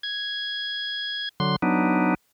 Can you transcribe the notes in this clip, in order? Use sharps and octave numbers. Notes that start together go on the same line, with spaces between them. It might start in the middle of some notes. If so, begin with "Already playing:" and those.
G#6
D3 F#3 C6
F#3 B3 D4 D#4